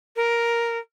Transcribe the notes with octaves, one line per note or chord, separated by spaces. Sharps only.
A#4